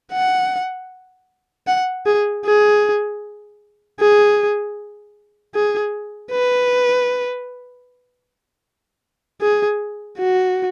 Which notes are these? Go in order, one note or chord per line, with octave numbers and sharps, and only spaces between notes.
F#5
F#5
G#4
G#4
G#4
G#4
B4
G#4
F#4